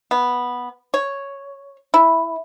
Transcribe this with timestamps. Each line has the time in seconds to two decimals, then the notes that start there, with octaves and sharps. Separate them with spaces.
0.11 B3
0.94 C#5
1.94 E4